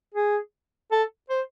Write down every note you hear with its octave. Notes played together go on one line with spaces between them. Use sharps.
G#4
A4
C5